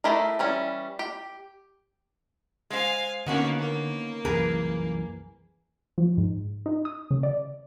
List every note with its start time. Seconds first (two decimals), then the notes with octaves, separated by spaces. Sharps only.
0.04 A3 E4 G4 G#4 A#4
0.39 E3 G3 C#4
0.99 G4
2.70 G#3 C5 F5 G#5
3.26 D3 D#3 A#3 B3 C#4 F#4
3.59 A#3
4.25 C2 F#2 E3 G#4 A#4 B4
5.98 F3
6.17 G#2
6.66 D#4
6.85 D#6
7.11 C#3
7.23 D5